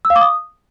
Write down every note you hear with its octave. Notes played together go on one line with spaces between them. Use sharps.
E6
F5
D6
D#6